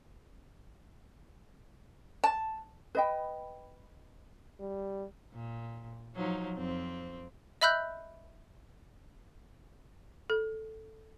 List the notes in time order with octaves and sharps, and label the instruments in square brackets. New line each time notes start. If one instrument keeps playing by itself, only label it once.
[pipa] A5
[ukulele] B4 D#5 G5
[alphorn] G3
[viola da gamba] A#2
F3 F#3 D#4
F2 C4
[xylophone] D#5 E5 B5 E6 F#6 G6
[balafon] A4